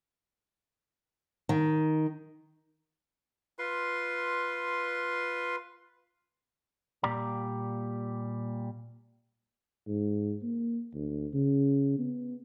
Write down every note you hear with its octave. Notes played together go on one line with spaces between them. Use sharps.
D#3
F4 B4 C6
A#2 G3 G4 D5 A#5
G#2
A#3
D2
C#3
B3